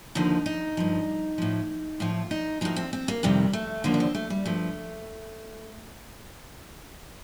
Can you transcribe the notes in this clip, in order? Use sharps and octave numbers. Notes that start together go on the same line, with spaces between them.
D#2 D3 F3 D#4
D#4
G2 F3
A2 F3
A2 F3 F4
D#4
A2 F3 D#4
C4
C4
A#3
F2 C3 D#3 G3
A3
D#2 D3 F3 A#3
D4
C4
A3
G3
G2 F3 A3